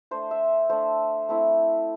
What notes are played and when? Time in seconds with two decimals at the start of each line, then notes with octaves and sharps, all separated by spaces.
0.11 A3 D4 C5
0.31 E5
0.70 A3 D4 C5
1.29 A3 C4 E4